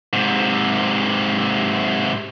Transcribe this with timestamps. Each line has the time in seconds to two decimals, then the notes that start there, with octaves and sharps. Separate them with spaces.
0.13 G#2 C3